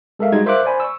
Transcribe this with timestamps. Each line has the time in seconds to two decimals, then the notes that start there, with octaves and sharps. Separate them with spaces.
0.19 G#3 A4 A#4 E5 F5
0.32 G3 G#3 D#4 F#4 G#6
0.46 A#4 C5 E5 F5 D6 F#6
0.65 C5 D5 G#5 B5
0.80 C#6 E6